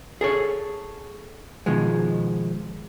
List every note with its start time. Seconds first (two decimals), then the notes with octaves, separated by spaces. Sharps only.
0.21 G#4 A4 C#5
1.66 B2 D#3 F3 G#3